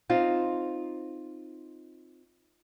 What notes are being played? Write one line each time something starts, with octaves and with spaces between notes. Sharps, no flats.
C4 D#4 F4